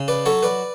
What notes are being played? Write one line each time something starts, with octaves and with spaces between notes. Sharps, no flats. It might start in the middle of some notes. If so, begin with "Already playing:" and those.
Already playing: C#3
B4 D5
F#3 A4 C#5
B4 D5